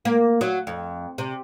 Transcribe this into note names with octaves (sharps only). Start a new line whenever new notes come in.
A#3
F#3
F2
C3